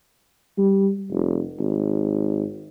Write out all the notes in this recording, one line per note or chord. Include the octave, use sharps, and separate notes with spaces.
G3
F1
G#1